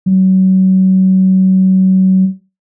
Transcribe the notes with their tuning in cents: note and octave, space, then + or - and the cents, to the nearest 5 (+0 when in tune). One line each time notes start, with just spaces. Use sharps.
F#3 +30